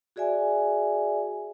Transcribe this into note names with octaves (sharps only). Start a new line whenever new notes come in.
F#4 G#4 D5 E5 G#5